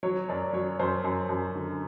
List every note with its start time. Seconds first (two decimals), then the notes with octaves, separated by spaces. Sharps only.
0.03 F#3 C#5
0.29 F#2 D5
0.53 F#3 C#5
0.79 F#2 C5
1.04 F#2
1.29 F#2
1.55 D3